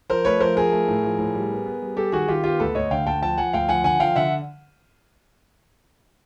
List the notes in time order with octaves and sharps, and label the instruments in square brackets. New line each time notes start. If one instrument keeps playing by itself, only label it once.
[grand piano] F3 A#4 C5
A3 B4 C#5
F3 A#4 C5
F3 G#4 A#4
A3
A2
F3
A2
G3
B3
B3
G3
G3 G4 A4
D#3 F#4 G#4
D#3 F4 G4
B3 F4 G4
D2 A4 B4
D2 C#5 D#5
D3 F5 G5
D2 G5 A5
F3 G5 A5
F3 F#5 G#5
D2 F5 G5
F3 F#5 G#5
D3 F#5 G#5
F3 F5 G5
D3 E5 F#5